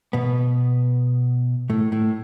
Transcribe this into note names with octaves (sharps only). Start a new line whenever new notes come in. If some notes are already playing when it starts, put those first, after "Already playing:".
B2 B3
A2 A3
A2 A3